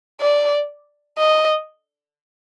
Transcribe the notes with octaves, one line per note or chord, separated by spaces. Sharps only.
D5
D#5